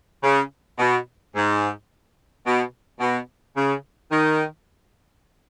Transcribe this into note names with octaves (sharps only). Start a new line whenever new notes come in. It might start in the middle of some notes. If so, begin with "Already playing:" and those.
C#3
B2
G#2
B2
B2
C#3
D#3